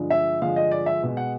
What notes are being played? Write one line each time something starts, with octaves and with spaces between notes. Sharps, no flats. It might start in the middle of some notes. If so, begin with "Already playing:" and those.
Already playing: G2 D3 F3 G#3
E5
G2 D3 F3 G#3 F5
D#5
D5
E5
B2 G#3
F#5